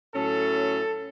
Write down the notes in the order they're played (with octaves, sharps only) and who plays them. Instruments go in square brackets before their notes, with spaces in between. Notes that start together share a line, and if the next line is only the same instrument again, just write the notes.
[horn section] A2 F#3 C#4 A4